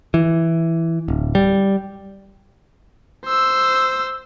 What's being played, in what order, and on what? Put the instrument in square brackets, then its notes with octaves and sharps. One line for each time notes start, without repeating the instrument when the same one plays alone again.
[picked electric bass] E3
D1
G3
[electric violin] C5 E6